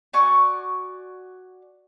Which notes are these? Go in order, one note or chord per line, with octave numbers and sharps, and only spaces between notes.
F#4 D5 G#5 C#6